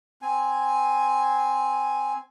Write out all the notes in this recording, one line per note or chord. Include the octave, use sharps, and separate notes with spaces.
C4 G#5